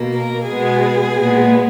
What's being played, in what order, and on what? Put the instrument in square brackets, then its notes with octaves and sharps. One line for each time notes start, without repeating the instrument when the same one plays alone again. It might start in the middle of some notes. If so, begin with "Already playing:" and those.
Already playing: [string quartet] B2 A#3
A#4
B2 G#3 B3 G#4
A#2 G#3 B3